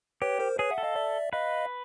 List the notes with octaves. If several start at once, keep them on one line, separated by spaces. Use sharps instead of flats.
G4 B4 C#5
A#4 C5
G#4 B4 C#5
E5 F#5
A4
D#5 F5
D5 E5
B4 D#5 F5